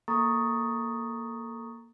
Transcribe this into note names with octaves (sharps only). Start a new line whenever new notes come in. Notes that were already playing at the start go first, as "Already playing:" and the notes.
A#3 A4 A#5 C#6 D#6 A6